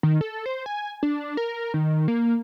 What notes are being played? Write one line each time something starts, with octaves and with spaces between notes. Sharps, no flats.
D#3
A4
C5
G#5
D4
A#4
D#3
A#3